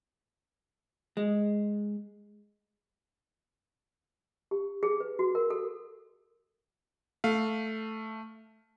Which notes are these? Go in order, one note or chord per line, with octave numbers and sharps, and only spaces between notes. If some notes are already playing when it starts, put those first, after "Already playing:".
G#3
G4
G#4
B4
F#4
A#4
A4
A3 F5